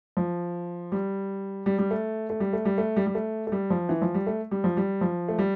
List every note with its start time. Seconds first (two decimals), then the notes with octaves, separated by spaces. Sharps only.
0.17 F3
0.92 G3
1.66 G3
1.79 G3
1.91 A3
2.30 A3
2.40 G3
2.53 A3
2.65 G3
2.78 A3
2.97 G3
3.07 G3
3.15 A3
3.47 A3
3.52 G3
3.70 F3
3.89 E3
4.02 F3
4.14 G3
4.27 A3
4.51 G3
4.64 F3
4.77 G3
5.01 F3
5.28 A3
5.39 G3